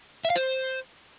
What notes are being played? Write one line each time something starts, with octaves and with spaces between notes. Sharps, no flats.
E5
F5
C5